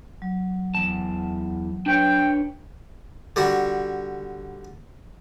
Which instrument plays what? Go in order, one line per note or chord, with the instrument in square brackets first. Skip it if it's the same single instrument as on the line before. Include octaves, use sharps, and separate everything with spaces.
[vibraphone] F#3
[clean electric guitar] E2 A5
[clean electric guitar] D4 B4 C#5 [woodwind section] G5
[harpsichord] D3 G3 F#4